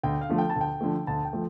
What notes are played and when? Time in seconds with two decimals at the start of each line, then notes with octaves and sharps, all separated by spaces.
0.03 D2 G5
0.21 F5
0.29 D3 F3 A3
0.38 G5
0.50 A5
0.56 D2 G5
0.81 D3 F3 A3
1.07 D2 A5
1.25 G5
1.33 F3 A3